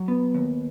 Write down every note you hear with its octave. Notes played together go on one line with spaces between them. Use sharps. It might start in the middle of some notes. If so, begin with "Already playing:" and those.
Already playing: F#3
B3
D#2